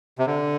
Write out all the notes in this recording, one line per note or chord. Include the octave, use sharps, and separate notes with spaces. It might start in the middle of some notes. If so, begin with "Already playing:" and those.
C3
D3